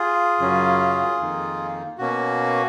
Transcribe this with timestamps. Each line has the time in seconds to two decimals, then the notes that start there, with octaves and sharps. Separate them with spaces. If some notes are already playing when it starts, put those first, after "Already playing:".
Already playing: F4 G#4
0.39 F#2 C#3 F#3 C#4
1.19 F2 D#3 A#3 D#4
1.98 B2 A#3 C#4 F#4